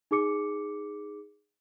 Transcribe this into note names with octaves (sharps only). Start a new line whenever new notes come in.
D#4 G#4 D6 C#7